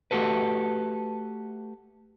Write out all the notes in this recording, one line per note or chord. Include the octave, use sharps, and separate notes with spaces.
A3 F#4 G4 A4 B4